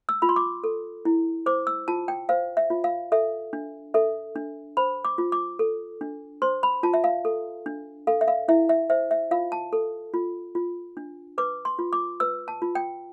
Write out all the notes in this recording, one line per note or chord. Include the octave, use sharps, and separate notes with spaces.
E6
F4 B5
C6
D6
A4
E4
C5 D6
E6
F4 A5
G5
C5 F5
E5
F4
F5
A4 E5
D4
A4 E5
D4
C5 B5
D6
F4
D6
A4
D4
C5 C6
B5
F4 A5
E5
F5
A4
D4
A4 F5
E5
F5
E4 E5
E5
C5 E5
E5
F4 F5
A5
A4
F4
F4
D4
B4 D6
C6
F4
D6
B4 E6
A5
F4
G5